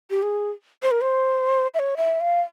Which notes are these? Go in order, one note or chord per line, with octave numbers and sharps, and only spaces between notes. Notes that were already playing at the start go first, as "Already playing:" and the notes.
G4
G#4
C5
A#4
C5
E5
C#5
E5
F5